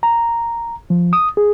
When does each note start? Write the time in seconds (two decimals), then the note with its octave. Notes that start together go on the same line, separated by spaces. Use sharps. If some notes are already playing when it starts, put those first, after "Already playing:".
0.03 A#5
0.90 F3
1.13 D#6
1.37 G#4